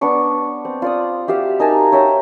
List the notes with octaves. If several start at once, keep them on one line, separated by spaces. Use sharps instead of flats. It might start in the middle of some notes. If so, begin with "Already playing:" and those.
B3 D4 C#6 D6
C4
F4 D5 D#6
F#4 G4 E5 F5
D#4 A#4 G#5 A5
C#5 E5 G5 A#5